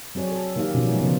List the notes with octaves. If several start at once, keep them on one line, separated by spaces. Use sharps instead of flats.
F#3 C4 G#4 C#5 D5
A4
D#3 A#3 D#4 G4 F5
B2 D#3 F3 C#4
F#3 A3 B3 D#4 F4 D5
C#3 E3 F3 B3